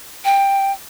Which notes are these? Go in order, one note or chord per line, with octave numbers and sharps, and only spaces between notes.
G5